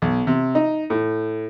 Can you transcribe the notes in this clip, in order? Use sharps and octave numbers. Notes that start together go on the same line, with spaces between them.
B1
C3
D#4
A2